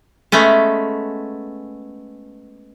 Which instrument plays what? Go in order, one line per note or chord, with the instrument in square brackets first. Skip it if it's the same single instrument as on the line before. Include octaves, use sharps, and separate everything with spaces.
[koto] G#3 A3 B3 C#4